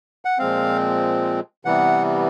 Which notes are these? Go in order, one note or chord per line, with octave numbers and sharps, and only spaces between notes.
F#5
A#2 F3 G#3 C4 F5
C3 E3 G3 B3 F#5